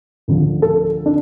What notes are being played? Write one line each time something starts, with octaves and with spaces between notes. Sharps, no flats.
D2 D3 F3
A4
D4